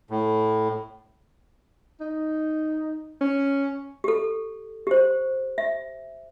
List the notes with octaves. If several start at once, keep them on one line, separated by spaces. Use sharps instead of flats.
A2
D#4
C#4
G4 A4
G4 C5
E5